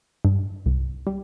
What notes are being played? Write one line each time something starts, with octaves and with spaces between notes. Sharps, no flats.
G2
C2
G3